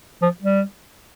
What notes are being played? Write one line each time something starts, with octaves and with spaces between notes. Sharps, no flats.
F3
G3